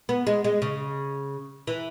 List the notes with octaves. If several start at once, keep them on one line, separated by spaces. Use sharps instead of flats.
B3
G#3
G#3
C#3
E3